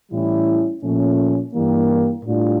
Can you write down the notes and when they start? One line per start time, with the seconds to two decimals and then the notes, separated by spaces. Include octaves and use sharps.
0.12 A2 E3 G3 C#4 E4
0.83 A#2 F3 A3 C#4
1.54 G2 E3 G3 A#3
2.24 A2 G3 D4 F4